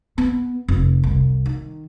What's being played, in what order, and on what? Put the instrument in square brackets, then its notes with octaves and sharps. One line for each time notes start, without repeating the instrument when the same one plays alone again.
[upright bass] B3
F1
C2
D#3